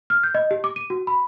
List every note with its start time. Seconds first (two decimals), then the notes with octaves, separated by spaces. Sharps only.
0.10 F6
0.23 G6
0.35 D#5
0.51 G4
0.64 D6
0.76 D#7
0.90 F#4
1.07 B5